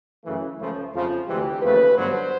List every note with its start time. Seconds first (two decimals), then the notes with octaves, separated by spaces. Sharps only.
0.23 F#2 C#3 E3 A3
0.58 C#2 C#3 F3 A3
0.93 F2 C#3 F3
1.26 D2 C3 E3 G#3 G4
1.60 D#2 C#3 F3 A3 B4
1.94 G2 D3 F#3 B3 C5